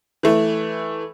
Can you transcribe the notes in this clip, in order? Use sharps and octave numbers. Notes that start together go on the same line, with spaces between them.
E3 A3